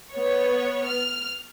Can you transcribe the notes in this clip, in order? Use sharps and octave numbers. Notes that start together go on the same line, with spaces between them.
B3 C#5
F6